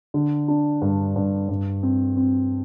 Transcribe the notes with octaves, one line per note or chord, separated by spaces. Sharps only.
D3
D4
G2
G2
G2
C4
C4